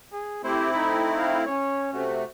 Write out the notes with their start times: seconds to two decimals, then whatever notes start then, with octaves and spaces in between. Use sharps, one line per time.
0.12 G#4
0.44 A3 C4 E4 G4 C5
0.74 D#4 B5
1.17 F5
1.46 C#4 C#5
1.93 C3 A3 F#4